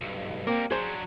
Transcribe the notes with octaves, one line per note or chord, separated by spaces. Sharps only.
B1 G2
G3 A#3 C4 A#4
F#3 D4 G#4 C5